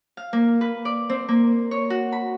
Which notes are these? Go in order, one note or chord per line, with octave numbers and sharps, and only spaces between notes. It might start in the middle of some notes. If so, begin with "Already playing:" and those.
F5
A#3
B4
D5
C4
A#3
C#5
F#4
B5